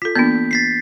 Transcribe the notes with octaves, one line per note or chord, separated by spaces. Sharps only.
F4 A4 B6
E3 A#3 B3 D4 G6
A6 B6 C7